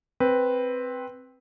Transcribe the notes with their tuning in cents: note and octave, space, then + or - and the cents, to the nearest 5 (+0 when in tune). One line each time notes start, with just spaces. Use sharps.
C4 +0 B4 +0